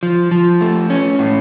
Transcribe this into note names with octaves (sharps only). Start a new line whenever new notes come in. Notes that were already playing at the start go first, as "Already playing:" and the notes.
F3
F3
A3
C#4
A2